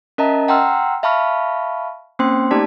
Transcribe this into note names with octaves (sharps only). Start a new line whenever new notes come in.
C#4 A#4 D#5 E5 A5 A#5
F#5 G5 A#5 C6 E6 F6
E5 F5 A5 B5 C#6 F6
A#3 C4 C#4 C5 G5 C6
A3 D#4 G4 D5 A5 B6